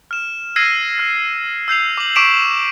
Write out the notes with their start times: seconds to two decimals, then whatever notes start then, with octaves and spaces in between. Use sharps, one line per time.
0.11 F6 E7
0.56 E6 F6 G#6 A#6 C7 D#7
0.98 F6 A#6
1.68 E6 G6 C7 F7
1.98 D6 F#7
2.15 C#6 D6 B6 D7 E7 F7